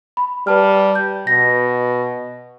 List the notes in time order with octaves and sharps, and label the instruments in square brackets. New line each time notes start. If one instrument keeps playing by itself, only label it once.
[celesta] B5
[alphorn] G3 [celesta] B4 A5 F6
[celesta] G6
[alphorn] B2 [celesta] A#6